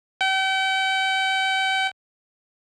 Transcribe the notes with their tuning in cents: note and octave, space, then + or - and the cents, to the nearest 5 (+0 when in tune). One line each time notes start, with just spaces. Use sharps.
G5 -40